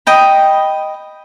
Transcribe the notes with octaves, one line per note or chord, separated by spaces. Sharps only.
D#5 G5 B5